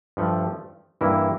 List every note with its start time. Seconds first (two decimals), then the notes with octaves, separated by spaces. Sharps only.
0.17 G2 F3 A3
1.01 G2 E3 A#3 E4